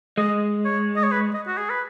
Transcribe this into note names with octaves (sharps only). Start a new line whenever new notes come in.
G#3 D#5
C#5
D#5
C#5
B4
D#5
F#4
G#4
B4